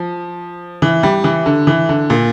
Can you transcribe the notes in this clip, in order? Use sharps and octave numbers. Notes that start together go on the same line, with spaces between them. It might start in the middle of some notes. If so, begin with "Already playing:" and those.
Already playing: F3
E3
G3
E3
D3
E3
D3
A#2